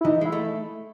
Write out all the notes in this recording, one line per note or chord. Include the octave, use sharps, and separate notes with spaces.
E4
E3 D#4
G#3 E4
A3